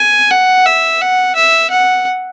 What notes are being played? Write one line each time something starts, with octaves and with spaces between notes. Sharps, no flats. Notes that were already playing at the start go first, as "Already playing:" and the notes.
Already playing: G#5
F#5
E5
F#5
E5
F#5